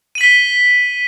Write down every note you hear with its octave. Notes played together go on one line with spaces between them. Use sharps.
B6 D#7 F#7 G7